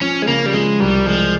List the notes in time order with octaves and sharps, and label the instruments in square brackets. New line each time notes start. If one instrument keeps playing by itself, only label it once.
[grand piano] F3 [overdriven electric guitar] C#4
[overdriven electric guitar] G#3
[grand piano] C#3 [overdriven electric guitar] A#3
[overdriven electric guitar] G3
[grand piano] F3 [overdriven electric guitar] G#3
[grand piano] C2 [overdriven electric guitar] G3
[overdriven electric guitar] F3 [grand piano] G#3